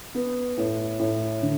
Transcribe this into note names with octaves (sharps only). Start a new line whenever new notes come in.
B3
A2
A2
D3